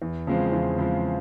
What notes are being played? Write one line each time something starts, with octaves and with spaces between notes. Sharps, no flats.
E2
C#3 F3 G#3 C4
E2
C#3 F3 G#3 C4